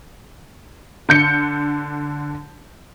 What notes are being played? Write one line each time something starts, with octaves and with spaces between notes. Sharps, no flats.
D3 G6 C#7